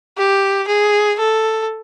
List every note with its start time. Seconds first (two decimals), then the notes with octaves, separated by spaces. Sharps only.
0.18 G4
0.68 G#4
1.19 A4